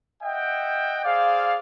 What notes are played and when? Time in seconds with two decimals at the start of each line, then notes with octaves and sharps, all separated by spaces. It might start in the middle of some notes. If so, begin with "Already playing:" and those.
0.23 D#5 E5 F#5 G5
1.04 G#4 C5 D5 F5